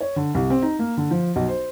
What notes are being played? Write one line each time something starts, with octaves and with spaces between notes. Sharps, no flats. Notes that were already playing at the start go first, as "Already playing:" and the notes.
C#5
D3
C2
C4
D#4
A#3
D3
F3
B1
C5